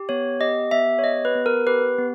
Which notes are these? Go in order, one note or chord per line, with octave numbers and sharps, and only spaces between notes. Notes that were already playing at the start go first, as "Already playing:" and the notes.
Already playing: G4
B3 C#5
G4 D#5
B3 E5
C#5
G4 D#5
B4
B3
A#4
G4 B4
B3